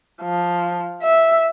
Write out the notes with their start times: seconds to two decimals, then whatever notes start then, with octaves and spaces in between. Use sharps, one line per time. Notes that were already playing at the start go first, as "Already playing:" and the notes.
0.22 F3
1.02 E5